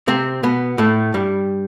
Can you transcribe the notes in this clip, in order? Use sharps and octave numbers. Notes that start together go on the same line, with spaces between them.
C3 C4
B2 B3
A2 A3
G2 G3